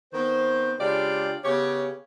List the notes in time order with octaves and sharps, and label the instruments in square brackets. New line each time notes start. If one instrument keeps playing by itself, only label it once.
[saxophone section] D#3 B3 C4 C5
C#3 G#3 D4 F4 G4 D5
C#3 B3 G4 C#5